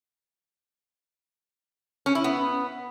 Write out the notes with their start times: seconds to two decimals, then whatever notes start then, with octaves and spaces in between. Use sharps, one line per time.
2.06 C#4
2.15 E4
2.24 B3